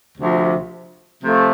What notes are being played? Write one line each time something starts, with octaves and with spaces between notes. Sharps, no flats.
D2 C3 F3
C3 F3 A3